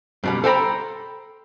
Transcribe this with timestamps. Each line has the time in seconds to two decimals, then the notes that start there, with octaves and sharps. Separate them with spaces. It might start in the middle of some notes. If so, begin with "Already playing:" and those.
0.24 F#2 B2 G3
0.44 A4 C5 G5 A#5 B5